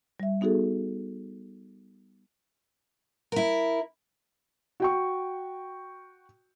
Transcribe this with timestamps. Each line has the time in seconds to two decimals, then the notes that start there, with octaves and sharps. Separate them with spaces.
0.20 G3 E5
0.41 B3 D#4 F#4 G#4 A4
3.32 E4 A#4
4.80 F#4 G5 C#6